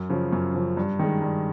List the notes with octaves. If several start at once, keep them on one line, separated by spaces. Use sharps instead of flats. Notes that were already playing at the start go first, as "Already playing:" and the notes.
Already playing: F#2
C#3 F3
F#2
C#3 F3
G2
D#3 G#3
G2